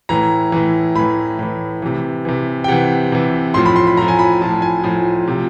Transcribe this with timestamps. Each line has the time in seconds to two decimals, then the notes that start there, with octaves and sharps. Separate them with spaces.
0.09 A2 E3 A#5
0.52 A2 E3
0.95 A2 E3 B5
1.39 A2 E3
1.82 C3 E3
2.25 C3 E3
2.64 G5
2.68 C3 E3 F#5
3.12 C3 E3
3.54 A2 F3 C6
3.66 B5
3.76 C6
3.87 B5
3.97 A2 F3 A#5
4.08 G#5
4.19 B5
4.41 A2 F3 A5
4.62 G#5
4.84 A2 F3 G#5
5.28 C3 F3